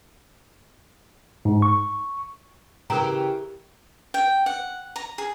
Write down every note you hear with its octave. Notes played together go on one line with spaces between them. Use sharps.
G#2
C#6
C#3 E3 G4 A#4 A#5
G5
F#5
A#5
G#4